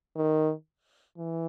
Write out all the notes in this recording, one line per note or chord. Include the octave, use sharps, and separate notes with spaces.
D#3
E3